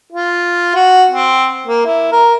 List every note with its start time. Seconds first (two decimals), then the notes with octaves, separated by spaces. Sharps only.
0.13 F4
0.75 F#4
1.11 C4
1.67 A#3
1.85 E4
2.12 A#4